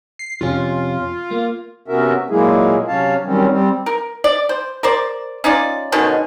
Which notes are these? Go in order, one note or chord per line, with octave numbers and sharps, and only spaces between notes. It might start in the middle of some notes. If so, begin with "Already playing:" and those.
C7
F2 C3 C#4 F4
A#3
C3 B3 C#4 F#4 A#4 E5
A#2 F#3 G#3 A#3 E4 G#4
C3 F#3 C#4 C#5 F5 A5
D#3 F#3 G3 C4 C#4
G3 C4
A#4
D5
C5
A#4 C5 D5
C#4 D#4 F4 D5
B2 D3 D#3 C#4